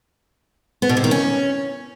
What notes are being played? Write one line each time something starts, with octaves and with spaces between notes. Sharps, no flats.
B3
B2
C3
D#3
C#4